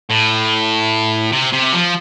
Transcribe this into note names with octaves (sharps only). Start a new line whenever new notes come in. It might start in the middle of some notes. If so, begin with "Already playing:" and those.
A2
C3
C3
F3